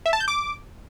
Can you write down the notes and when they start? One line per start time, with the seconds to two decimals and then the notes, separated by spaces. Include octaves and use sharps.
0.06 E5
0.13 A5
0.20 G6
0.28 D6